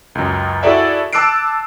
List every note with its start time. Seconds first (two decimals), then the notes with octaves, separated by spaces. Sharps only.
0.15 C#2 F#2
0.63 E4 F#4 G#4 A4 D5 E5
1.13 A5 D6 E6 F#6 C7 D7